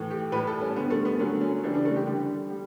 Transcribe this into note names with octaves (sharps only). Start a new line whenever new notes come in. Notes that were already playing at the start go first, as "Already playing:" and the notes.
Already playing: A2 E3 A3
G4
A2 G3 B4
A4
C#4
D3 G3 B3
A3
B3
D3 F#3 A3 C#4
C#4
C#3 E3 G3 D4
D4
A3
G4
D3 G3 G4
G3